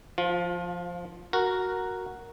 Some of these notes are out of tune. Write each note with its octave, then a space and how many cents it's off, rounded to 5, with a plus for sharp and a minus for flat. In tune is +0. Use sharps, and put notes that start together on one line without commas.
F3 +0 F4 +30
F#4 +0 A#4 +0